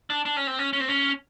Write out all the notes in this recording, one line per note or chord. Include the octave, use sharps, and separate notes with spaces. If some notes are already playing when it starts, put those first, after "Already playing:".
D4
D4
C#4
C4
C#4
C#4
C4
C#4